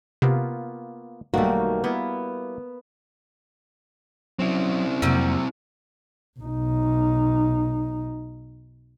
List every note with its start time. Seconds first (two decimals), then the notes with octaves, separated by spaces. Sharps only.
0.22 C3 A#3 B3 F4
1.34 B1 D#3 G3 A3 A#3 F#4
1.84 A#3 B3 E4
4.39 F#3 C4 C#4 E4
5.02 F2 C3 F#3 G3 A#3 F#4
6.39 B1 D#4